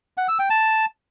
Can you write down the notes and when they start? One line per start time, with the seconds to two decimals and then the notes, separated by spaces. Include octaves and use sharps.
0.17 F#5
0.28 E6
0.39 G5
0.50 A5